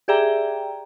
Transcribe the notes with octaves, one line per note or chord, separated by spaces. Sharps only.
G4 G#4 D5 E5 G5 A#5